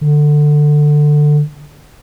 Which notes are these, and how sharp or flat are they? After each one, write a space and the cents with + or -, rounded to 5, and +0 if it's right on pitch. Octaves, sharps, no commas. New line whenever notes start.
D3 +15